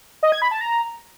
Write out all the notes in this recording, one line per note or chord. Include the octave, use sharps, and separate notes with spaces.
D#5
G#6
B5
A5
A#5